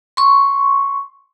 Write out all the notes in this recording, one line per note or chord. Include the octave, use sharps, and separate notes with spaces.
C6 C#6